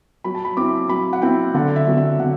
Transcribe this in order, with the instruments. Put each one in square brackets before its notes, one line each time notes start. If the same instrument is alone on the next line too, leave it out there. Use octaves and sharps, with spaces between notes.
[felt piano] F#3 B5
A5
B5
C4 E4 D6
F#3 B5
F#5
C4 E4 G5
D3 F#5
E5
F#3 C4
E5
D3 F#5